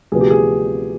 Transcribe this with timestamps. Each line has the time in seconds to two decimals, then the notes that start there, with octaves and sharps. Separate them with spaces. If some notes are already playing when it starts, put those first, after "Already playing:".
0.12 D2 C3 F3 B3 G#4
0.21 G4
0.30 G#4